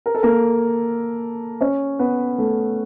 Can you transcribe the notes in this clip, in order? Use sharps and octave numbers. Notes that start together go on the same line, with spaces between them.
A#4
A4
A#3 A#4
C#4 C#5
B3 B4
A3 A4